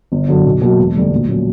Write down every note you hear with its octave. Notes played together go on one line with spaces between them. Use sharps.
G1
F#2 D3 F#3
B1
B2 F#3 A#3
E1
D2 D3 G3
A#1
A#2 F#3 C#4